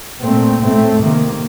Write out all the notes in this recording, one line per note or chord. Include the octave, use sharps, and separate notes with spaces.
A#2 A3 C4
A2 A3 C4
C3 D#3 A#3